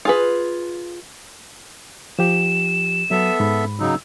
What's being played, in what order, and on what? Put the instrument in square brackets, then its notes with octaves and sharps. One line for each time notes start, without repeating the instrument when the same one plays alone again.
[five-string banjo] F4 G#4 B4
[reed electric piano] F3 G4 [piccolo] E7
[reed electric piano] F#3 [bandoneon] B3 A4 E5
[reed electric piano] G#2 B5
[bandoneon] C#3 F#3 D#4 [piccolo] E6